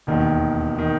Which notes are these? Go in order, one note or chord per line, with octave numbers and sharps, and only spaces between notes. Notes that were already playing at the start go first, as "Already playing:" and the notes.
E1 D#2 D#3
D#3